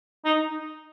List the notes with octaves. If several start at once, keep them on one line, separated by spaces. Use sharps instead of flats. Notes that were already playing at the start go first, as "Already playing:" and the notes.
D#4